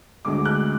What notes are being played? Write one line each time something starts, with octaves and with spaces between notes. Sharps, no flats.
D2 D3 G#3 D6
F#6